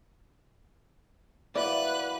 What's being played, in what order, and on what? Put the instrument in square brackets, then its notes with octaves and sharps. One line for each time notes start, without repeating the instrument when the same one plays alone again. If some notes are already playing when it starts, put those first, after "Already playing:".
[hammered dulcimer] E3 F#3 A#3 [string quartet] B4 F#6 [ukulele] D5